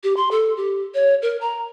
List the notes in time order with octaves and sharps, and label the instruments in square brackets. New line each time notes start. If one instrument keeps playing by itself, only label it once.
[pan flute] G4
C6
A4
G4
C#5
A#4
A#5